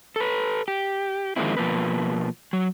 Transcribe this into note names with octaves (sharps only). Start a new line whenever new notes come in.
A4 B4
G4
D#3 F3 G#3 A#3 C4 E4
B2 F3 A#3 B4
F#3